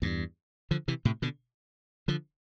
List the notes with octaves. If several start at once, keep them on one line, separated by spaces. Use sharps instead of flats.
E2 G2
D3 F3
C3 E3
A2 C3
B2 D3
D3 F3